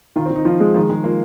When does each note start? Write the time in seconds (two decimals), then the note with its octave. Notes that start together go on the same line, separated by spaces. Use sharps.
0.16 D#3 F4
0.26 C4
0.30 D#3
0.36 D#4
0.45 F3 F4
0.60 G#3
0.74 D#3 F3
0.90 D#3 G#3
1.04 A#3 F4